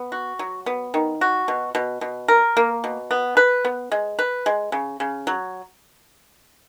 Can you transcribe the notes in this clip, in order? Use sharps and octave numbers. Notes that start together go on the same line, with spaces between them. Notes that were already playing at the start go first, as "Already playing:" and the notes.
Already playing: B3
F#4
F#3
B3
D#3
F#4
B2
B2
B2
A#4
A#3
B2
B3
B4
B3
G#3
B4
G#3
C#3
C#3
F#3